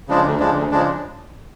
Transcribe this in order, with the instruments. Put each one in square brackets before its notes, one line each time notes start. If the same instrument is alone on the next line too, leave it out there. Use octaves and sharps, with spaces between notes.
[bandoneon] C#3 F3 G#3 D4
D2
C#3 F3 G#3 D4
D2
C#3 F3 G#3 D4